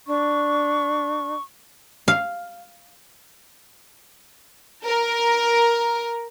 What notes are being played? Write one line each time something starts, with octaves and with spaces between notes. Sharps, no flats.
D4 C#6
F5
A#4